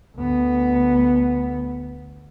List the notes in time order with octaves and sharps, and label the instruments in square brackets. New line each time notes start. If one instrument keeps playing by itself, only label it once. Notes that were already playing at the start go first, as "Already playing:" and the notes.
[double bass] D2 B3